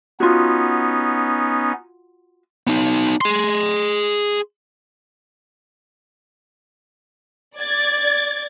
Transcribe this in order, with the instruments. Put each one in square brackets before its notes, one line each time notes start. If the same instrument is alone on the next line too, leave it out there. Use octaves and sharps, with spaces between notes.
[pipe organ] B3 C#4 D#4 [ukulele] F4 F#4
[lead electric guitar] B3 D#4
G#4 C6
[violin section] D5 G#6 A6